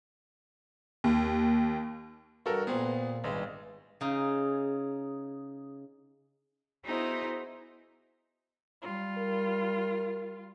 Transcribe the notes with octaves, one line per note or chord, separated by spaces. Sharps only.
D#2
G2 F#4 A4 A#4
A#2 B3 C4 G#4
G#1 G2 G#3
C#3 D#4 G#4
B3 D#4 E4 F#4 G#4 C5
G3 F4
A#4